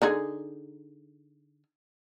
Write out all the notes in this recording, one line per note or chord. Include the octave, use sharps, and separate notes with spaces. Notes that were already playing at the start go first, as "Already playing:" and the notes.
D3 D#4 G#4